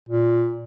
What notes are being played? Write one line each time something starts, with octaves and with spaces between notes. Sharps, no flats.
A#2